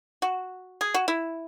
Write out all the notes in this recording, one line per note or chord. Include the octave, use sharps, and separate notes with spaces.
F#4
G#4
F#4
E4